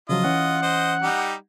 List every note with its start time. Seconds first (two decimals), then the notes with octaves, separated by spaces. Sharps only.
0.09 C#3 F3 F#3 F4 D#5
0.24 E3 C#4 F#5
0.62 C5 D#5
1.02 G3 D#4 G4